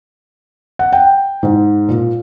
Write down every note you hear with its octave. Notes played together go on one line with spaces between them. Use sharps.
F#5
G5
G#2
A#2